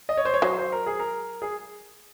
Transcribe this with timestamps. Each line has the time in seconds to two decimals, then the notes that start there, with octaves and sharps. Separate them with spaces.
0.09 D#5
0.17 C#5
0.25 C5
0.34 C#5
0.42 F#3 C5
0.58 C5
0.72 A#4
0.86 G#4
0.99 A#4
1.42 G#4